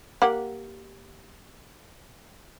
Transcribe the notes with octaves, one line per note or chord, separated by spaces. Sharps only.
A#3 G4 F#5